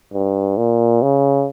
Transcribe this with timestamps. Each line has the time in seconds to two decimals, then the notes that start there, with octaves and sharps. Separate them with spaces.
0.13 G2
0.57 A#2
1.02 C#3